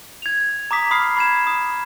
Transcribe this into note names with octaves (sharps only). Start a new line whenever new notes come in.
G#6 F7
A#5 D6 D#6 B6
B5 D#6 F6 C7
B5 G#6 E7
D#6